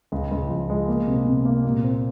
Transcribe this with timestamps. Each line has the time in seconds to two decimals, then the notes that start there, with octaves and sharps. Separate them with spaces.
0.12 C#2
0.32 C#2
0.49 F3
0.70 G#3
0.88 A#3
1.08 C3
1.26 C3
1.45 A#3
1.65 A#2
1.84 C4